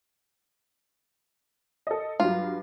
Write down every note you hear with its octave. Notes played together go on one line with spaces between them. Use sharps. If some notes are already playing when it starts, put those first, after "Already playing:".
A4 D#5
G2 F#3 F4